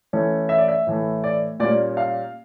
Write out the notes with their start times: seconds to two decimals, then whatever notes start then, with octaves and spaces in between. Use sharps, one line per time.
0.13 E3 A3 C#4
0.49 E5
0.58 D5
0.68 E5
0.87 A2 E3 A3
1.24 D5
1.60 A#2 G3 A#3 C#4 D5
1.97 F5